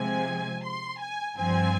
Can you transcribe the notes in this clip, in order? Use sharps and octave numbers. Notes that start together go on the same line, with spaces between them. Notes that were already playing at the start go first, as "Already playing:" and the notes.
Already playing: C3 F3 G#3 C4 G#5
C6
G#5
G2 F3 C4 G#5